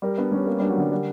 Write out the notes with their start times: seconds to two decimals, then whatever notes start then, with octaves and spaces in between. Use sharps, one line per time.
0.02 G3 A#4
0.18 B3 D4
0.32 G3 C#4
0.47 A#3 G4
0.59 G3 D4
0.69 F#3
0.77 D3 G3
0.91 G3 A#4